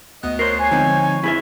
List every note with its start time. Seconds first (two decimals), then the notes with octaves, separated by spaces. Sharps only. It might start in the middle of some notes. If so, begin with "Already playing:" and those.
0.23 D2 B3 D#5 F#6
0.39 A#4 C5 C#5 C7
0.59 C#5 G#5
0.71 D3 F3 G#3 C4 D#4
1.24 E4 G#4 E5